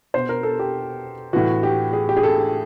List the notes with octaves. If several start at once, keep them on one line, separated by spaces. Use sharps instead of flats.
B2 C5
A#4
A4
G4
A2 E3 F#4
G4
G#4
G4
G#4
A4